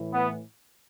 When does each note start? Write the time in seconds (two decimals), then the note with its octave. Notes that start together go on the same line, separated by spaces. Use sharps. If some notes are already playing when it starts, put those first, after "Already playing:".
Already playing: A2 E3
0.13 B3